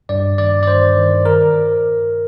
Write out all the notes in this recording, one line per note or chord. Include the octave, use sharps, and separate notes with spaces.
G2 D5
D#3 D5
D5
G2 C5
D#3
A#4